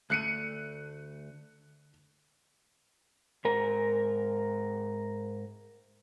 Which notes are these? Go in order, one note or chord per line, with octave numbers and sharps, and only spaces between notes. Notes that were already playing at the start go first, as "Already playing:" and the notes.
D2 A3 F#6 C#7 D#7
G#2 A#4